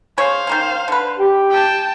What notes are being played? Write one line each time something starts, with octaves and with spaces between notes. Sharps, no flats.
G#4 C5 C#5 F5
D#3 A#3 C#4
D3 B4
G4
G5 A5